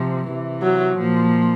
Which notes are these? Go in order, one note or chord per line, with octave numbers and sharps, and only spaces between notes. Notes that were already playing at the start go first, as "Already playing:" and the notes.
Already playing: C3 F3
C3 E3
F#3
A#2 F3